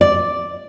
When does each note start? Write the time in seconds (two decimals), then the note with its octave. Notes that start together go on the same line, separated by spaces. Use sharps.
0.01 D5